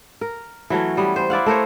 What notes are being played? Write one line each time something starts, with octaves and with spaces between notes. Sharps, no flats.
A#4
E3 F#3 A3 C#4
G3 B3
C5
E4 D5 F5 F#5
A3 A#4 C5 C#5